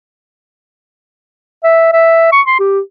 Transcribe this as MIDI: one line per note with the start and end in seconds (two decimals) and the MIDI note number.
1.63 1.88 76
1.93 2.30 76
2.32 2.41 85
2.46 2.58 84
2.59 2.80 67